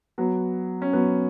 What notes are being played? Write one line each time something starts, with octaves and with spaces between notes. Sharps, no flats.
F#3 B3
C#4
F#3 B3